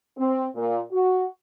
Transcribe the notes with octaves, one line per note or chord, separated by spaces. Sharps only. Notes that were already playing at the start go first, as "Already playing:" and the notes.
C4
A#2
F#4